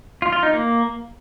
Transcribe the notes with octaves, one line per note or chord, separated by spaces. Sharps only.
F4
F4
D#4
A#3